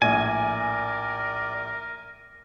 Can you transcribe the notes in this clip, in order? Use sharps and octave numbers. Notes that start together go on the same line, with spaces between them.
A#1 A2 A#4 D5 G#5